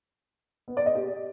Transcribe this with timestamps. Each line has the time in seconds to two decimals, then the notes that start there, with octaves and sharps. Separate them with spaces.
0.68 B3
0.77 D5
0.86 D#5
0.95 G4